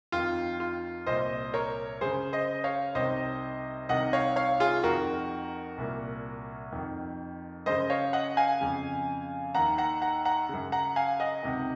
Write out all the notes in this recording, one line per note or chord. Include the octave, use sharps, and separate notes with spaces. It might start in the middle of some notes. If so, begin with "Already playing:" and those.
F2 D#3 F4
F4
C2 A#2 C5 D#5
A#4 C#5
F#2 C#3 G#4 C5
C5 D#5
C#5 F5
C2 C3 D#3 C5 D#5
C2 C3 D#3 D#5 F#5
C#5 F5
C#5 F5
F4 G#4
F2 D#3 F#4 A#4
C2 A#2
F2 D#3
F#2 C#3 C5 D#5
C#5 F5
D#5 F#5
F5 G#5
F2 C#3
D#2 D#3 F#5 A#5
F#5 A#5
F#5 A#5
F#5 A#5
F#2 C#3
F#5 A#5
F5 G#5
D#5 F#5
C#2 C3 D#3